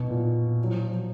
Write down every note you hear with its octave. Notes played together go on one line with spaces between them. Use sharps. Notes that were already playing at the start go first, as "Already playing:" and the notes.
Already playing: B2
A#2
F#3
F3
F3
F#3